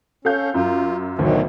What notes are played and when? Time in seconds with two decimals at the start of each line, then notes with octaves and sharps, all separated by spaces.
0.25 C#4 A4 F5 G6
0.54 F#2 F4
1.19 D2 B2 D#3 F#3